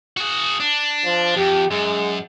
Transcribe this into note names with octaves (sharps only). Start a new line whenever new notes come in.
F#4 G#4
D4
F3
F2 G4
F#2 G#3